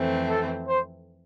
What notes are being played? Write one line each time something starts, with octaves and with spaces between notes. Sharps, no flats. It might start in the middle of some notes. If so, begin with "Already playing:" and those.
Already playing: F2 E3 A3 C4
A4
C5